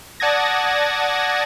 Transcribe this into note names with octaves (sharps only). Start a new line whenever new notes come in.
D5 F#5 A5 D#6 G#6 A#6